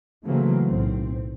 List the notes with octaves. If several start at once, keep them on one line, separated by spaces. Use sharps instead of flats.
C#3 E3 F#3 A3 A#3 C4
B1 A2 C4